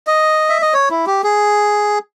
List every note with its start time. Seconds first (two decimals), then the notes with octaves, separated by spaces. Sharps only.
0.07 D#5
0.49 E5
0.62 D#5
0.74 C#5
0.90 E4
1.07 G4
1.23 G#4